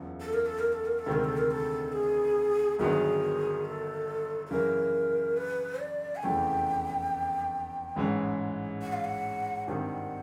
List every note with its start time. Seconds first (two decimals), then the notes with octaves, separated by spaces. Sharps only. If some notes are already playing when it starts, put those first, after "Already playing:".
Already playing: F#1 E2 C#3 F3
0.21 A4
0.33 A#4
0.46 A4
0.59 A#4
0.72 A4
0.86 A#4
0.98 A4
1.06 D2 C3 D#3 G#3 C4
1.12 A#4
1.24 A4
1.37 A#4
1.51 A4
1.92 G#4
2.79 G1 G2 D#3 F#3 B3 G#4
3.65 A4
4.46 A4
4.50 F#2 C#3 E3 A#4
5.37 B4
5.80 D5
6.16 G#5
6.23 F1 E2 C#3 E3 A3 G5
7.96 A1 G#2 E3 G#3 C#4
8.82 F#5
8.93 F5
9.04 F#5
9.68 G#1 G2 D#3 G3 C4 F#5